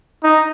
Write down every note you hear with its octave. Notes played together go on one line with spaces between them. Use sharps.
D#4